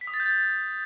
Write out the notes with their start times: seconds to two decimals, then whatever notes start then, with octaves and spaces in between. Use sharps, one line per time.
0.01 B6
0.07 D#6
0.14 A6
0.20 G6
0.26 A6